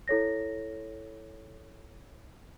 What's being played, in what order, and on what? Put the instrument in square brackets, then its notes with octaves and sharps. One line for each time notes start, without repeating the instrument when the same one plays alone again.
[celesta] E4 A4 C#5 A#6